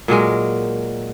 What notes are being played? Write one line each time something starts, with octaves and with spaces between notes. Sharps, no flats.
A#2 F#3 G#3 A#4